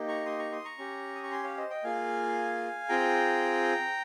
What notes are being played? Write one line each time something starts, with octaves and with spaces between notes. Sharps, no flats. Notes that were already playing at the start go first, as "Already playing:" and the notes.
Already playing: A#3 D#4 G4
A#5 C#6
C6 D#6
A#5 C#6
C6 D#6
A#5 C#6
C#4 G4
D#6
C#6
G#5 C6
C#5 F5
C5 D#5
D#5 G5
A#3 F4 G#4 F5 G#5
C4 F4 G#4 G5 A#5